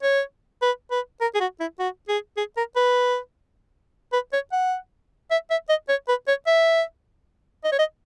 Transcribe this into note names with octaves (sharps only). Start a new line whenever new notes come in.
C#5
B4
B4
A#4
G#4
F#4
E4
F#4
G#4
G#4
A#4
B4
B4
C#5
F#5
E5
E5
D#5
C#5
B4
C#5
E5
D#5
C#5
D#5